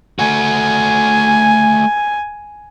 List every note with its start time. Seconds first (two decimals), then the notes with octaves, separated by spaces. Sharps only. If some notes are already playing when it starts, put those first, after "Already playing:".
0.19 A3 F#4 G#5